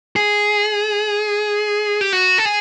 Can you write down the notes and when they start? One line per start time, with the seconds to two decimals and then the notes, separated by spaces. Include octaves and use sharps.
0.16 G#4
2.01 G4
2.13 F#4
2.38 A4
2.45 G#4